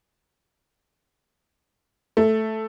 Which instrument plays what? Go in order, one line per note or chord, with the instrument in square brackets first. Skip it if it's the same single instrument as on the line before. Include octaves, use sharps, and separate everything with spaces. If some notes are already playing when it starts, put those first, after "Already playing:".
[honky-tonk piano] A3